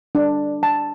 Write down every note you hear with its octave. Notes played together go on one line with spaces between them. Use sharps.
D4
A5